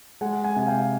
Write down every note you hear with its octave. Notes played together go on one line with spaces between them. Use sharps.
G#3 F#5 G#5
F#5 G#5
C3 G#5
F5 G5